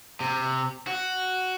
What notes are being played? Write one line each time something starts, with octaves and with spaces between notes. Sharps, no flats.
C3
F#4